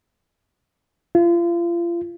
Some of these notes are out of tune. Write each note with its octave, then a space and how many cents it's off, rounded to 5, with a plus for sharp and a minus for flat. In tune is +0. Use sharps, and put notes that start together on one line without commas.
F4 -35